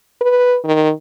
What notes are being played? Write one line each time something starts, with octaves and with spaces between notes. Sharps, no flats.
B4
D#3